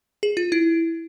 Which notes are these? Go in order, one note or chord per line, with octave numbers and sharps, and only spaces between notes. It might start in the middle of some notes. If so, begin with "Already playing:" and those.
G#4
F4
E4